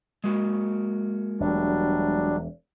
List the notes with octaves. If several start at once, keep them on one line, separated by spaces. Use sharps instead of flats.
G#3 A#3 F#4
E1 F#3 G3 D4